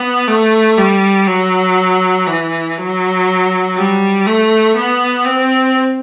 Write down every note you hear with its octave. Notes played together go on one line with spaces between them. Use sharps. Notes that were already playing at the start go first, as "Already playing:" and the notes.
Already playing: B3
A3
G3
F#3
E3
F#3
G3
A3
B3
C4